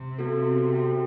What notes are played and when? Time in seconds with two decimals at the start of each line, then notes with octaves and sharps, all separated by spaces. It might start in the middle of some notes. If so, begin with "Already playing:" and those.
Already playing: C3
0.19 B3 F#4 A4
0.73 F#4 A4 E5 G5